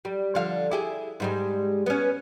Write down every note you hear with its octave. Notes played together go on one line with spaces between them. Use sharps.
G3
D3 F3 F5
E4 G4 G#4
G#2 G3 G#3
B3 C#4